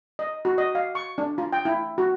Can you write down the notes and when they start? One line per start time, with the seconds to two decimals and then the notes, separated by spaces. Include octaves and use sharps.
0.19 D#5
0.45 F#4
0.58 D#5
0.75 F5
0.95 C#6
1.18 D4
1.38 F4
1.53 G5
1.65 E4
1.98 F#4